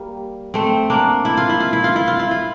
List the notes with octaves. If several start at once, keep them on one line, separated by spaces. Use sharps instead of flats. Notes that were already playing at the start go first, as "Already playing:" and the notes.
Already playing: G3 A#3
A3 C4
A#3 D4
E4
F4
E4
F4
E4
F4
E4
F4
E4
F4